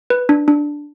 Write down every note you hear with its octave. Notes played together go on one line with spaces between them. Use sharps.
B4
D4
D4